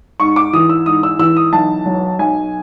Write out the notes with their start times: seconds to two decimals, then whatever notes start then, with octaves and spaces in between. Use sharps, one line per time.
0.20 G#2 C#6
0.36 D6
0.53 E3 D#6
0.69 E6
0.86 G#2 D#6
1.03 E6
1.19 E3 E6
1.37 D#6
1.53 B1 A5
1.86 F#3
2.19 B1 G#5